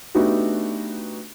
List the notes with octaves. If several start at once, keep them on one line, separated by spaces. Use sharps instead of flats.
A3 B3 D4 D#4 F#4 G4